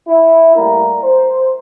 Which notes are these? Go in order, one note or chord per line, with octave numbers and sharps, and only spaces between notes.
E4
A2 G3 A#3 A#4
C5